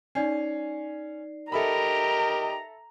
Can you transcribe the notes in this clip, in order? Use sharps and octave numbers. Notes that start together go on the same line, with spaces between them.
C#4 D#4 D5 C7
G4 A4 A#4 D#5 E5 A#5 B5